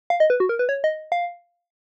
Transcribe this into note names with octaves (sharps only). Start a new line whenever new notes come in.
F5
D#5
B4
F#4
A#4
B4
C#5
D#5
F5